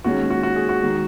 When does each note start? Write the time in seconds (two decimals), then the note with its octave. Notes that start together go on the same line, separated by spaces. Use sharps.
0.04 D#2 D#3 G#3 C#4 F#4
0.30 F#4
0.43 F#4
0.56 G#4
0.69 F#4
0.82 D#3 G#3